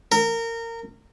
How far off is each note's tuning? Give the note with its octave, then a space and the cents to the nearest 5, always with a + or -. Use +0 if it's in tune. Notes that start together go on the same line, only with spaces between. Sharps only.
A#4 -25